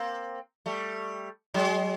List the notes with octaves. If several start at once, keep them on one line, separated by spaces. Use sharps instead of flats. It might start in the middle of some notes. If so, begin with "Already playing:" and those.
Already playing: A#3 C4
G3 A3
F#3 G#3